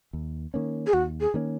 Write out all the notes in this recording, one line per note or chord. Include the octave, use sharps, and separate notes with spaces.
D#2
D#3 A#3 C#4
G#4
D#2 F#4
G#4
D#3 A#3 C#4